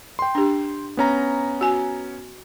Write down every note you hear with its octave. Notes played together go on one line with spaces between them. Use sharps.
G5 C6
D4 G4
B3 C#4 A#5
F#4 G#5